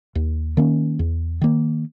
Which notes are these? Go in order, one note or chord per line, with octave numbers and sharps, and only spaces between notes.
D#2
D#3 A#3 C#4
E2
D#3 A#3